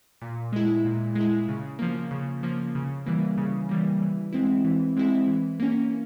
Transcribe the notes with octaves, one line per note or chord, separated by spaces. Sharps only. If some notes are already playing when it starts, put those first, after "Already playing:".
A#2
G#3 E4
A#2
G#3
E4
C#3
F3 A#3
C#3
F3 A#3
C#3
E3 G3 A#3
C#3
E3 G3 A#3
E3
G#3 C4 E4
E3
G#3 C4 E4
E3
A#3 C#4